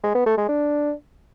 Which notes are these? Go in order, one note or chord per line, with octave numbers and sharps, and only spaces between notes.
G#3
B3
A3
G#3
D4